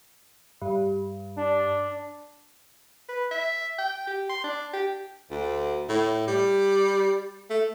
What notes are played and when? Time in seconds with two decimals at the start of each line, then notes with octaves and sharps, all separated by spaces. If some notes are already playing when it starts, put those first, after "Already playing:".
0.61 G2
1.37 D4
3.09 B4
3.31 E5
3.79 G5
4.08 G4
4.30 C6
4.44 D4
4.74 G4
5.31 D2
5.89 A2
6.27 G3
7.50 A3